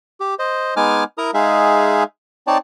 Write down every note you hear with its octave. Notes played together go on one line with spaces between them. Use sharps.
G4
C5 D#5
G#3 B3 D#4 G#5 D6 F6
E4 A#4 A#5 D#6
G#3 D#4 G#4 E5 F5
C4 D#4 C#5 D5 A5